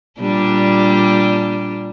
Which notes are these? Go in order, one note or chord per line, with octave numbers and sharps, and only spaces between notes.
A#2 G3 D4